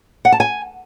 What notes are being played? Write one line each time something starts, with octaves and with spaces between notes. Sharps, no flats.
F#5
A5
G#5